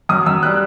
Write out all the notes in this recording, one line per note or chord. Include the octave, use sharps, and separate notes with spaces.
F#2 D#6
F#2 E6
G3 F#6